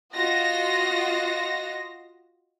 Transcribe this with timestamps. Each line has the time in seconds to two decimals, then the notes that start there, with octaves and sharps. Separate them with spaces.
0.14 F4 F#4 D#5 A#6